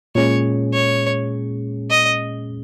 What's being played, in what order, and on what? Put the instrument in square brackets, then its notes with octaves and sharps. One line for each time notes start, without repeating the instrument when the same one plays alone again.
[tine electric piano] A#2 G#3 C#4 G#4 [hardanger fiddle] C#5
[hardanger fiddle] C#5
D#5